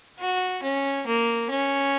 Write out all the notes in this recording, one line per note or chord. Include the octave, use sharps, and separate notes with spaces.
F#4
C#4
A#3
C#4